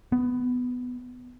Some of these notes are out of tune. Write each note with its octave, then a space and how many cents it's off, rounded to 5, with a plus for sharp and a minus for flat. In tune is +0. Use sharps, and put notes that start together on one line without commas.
B3 +10